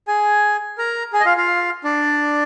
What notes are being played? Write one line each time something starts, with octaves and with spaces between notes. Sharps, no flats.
G#4 G#5
A#4 A#5
G#4 G#5
D#5
F4 F5
F4 F5
D4 D5